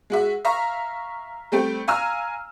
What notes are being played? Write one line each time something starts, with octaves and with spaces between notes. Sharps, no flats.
G#3 F#4 E5
E5 F5 A#5 C#6
G3 A3 C4 G4
F5 G#5 A#5 E6 F6